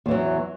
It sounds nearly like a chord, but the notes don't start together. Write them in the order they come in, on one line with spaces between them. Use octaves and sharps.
E2 E3 F#3